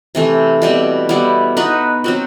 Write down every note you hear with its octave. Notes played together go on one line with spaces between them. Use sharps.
C3 E3 A3
B2 G3 C4
G3 B3 E4
B3 D#4 F#4 B4
F#3 C4 F#4